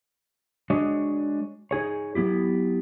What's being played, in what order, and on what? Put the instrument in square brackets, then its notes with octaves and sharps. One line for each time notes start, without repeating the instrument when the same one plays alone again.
[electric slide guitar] G#3 D4 F#4 C#5 D#5
D#4 G#4 C#5
F#3 B3 E4 G4